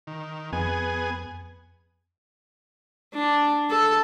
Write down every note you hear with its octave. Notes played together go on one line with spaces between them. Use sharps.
D#3
F2 B3 G#4 G#5
D4
A4